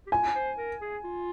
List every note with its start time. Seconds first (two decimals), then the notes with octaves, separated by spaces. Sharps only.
0.07 G4
0.12 F4 G#5
0.35 C5
0.58 A#4
0.81 G#4
1.04 F4